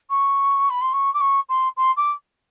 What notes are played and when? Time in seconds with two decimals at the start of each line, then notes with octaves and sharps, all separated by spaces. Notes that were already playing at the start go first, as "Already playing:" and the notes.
0.09 C#6
0.70 B5
0.81 C6
0.93 C#6
1.14 D6
1.20 C#6
1.49 C6
1.77 C6
1.97 D6